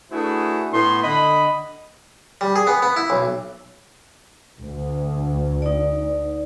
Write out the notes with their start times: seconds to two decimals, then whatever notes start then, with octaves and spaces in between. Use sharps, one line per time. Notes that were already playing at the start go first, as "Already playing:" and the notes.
0.12 A3 D4 E4 F#4 G#4 B4
0.72 A2 B3 C6
1.03 D3 D#5 B5
2.41 G3
2.56 G#4
2.67 B3
2.82 B3
2.96 E4
3.10 B1
4.61 D2
5.62 D#4 D5